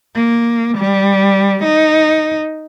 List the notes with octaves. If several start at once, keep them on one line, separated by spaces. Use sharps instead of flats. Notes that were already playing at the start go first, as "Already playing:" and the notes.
A#3
G3
D#4